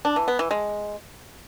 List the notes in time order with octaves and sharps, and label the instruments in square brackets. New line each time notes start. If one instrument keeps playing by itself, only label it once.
[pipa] D4
E3
B3
E3
G#3